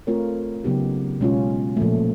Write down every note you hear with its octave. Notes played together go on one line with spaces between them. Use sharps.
A3 C4 F4 A#4 C#5
C#3 F#3 B3 D#4 G4
B2 G#3 C#4 F4
A#2 F3 A3